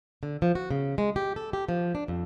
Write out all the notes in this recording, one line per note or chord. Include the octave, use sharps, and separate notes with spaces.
D3
F3
F#4
C#3
G#3
G4
A4
G4
F3
D4
F2